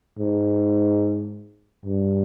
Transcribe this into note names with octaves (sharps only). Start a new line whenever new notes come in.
G#2
G2